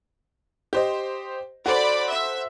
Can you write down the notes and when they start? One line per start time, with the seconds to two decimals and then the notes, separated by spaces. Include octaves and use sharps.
0.73 G4 C5 D#5
1.66 F#4 A4 C5 D5 B5
2.10 E5